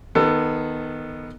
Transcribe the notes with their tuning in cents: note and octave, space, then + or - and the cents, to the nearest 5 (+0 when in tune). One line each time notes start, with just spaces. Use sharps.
D#3 +0 B3 +0 A4 +25